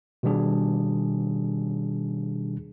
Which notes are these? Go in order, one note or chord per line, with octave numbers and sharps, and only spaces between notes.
B2 D#3 G3 D4 G#4